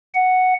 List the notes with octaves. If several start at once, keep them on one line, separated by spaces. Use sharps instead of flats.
F#5